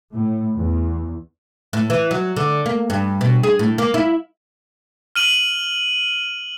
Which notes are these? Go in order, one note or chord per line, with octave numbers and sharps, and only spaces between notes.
A2
E2
A2
E3
F#3
D3
A#3
G2
B2
G#4
A2
A#3
E4
F6 D#7 F#7